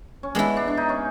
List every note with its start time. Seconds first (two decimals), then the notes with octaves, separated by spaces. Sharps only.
0.23 C#4
0.35 G#3 B3 D4 E4
0.57 D4
0.68 D4
0.77 D#4
0.89 C#4